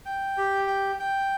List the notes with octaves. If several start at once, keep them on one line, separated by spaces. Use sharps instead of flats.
G5
G4
G5
G5